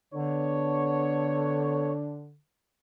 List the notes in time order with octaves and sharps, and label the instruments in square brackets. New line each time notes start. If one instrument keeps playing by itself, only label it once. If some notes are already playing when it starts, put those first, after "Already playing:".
[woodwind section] D3 [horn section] B3 A4 C#5 [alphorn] D4